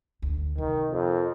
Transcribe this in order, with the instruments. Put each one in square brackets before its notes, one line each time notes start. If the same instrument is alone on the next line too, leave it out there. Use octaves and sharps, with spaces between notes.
[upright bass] D2
[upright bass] C3 [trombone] D#3
[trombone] F2